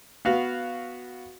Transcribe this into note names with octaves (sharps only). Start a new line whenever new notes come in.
B3 F#4 F5